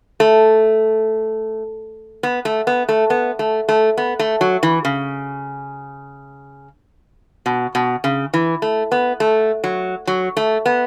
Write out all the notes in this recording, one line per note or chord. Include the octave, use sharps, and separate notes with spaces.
A3
B3
A3
B3
A3
B3
A3
A3
B3
A3
F#3
E3
C#3
B2
B2
C#3
E3
A3
B3
A3
F#3
F#3
A3
B3